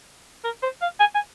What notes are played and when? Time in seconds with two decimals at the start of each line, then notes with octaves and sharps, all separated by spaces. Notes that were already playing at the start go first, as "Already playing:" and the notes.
0.44 A#4
0.63 C5
0.82 F5
1.00 G#5
1.15 G#5